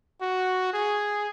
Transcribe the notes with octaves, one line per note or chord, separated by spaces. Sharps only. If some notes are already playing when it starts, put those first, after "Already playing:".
F#4
G#4